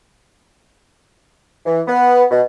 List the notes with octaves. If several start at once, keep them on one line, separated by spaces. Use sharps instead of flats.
E3
B3
B2